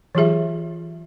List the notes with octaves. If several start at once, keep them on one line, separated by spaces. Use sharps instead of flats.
E3 F#3 F4 G4 G#4 E5